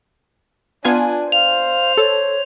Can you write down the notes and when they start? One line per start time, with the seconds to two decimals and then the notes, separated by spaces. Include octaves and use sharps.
0.85 B3 D4 F4 G#5
1.32 C5 F5 F7
1.97 A4 C#5